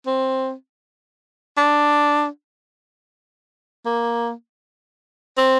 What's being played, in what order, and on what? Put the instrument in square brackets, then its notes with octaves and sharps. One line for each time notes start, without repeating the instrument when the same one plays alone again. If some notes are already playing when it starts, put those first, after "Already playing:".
[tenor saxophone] C4
D4
A#3
C4